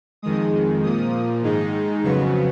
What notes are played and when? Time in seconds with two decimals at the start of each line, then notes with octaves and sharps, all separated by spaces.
0.22 F2 D#3 G#3 D#6
0.83 A#2 F3 A#3 D#6
1.43 G#2 D#3 G#3 D#4
2.03 F2 C#3 F#3 B3 C#6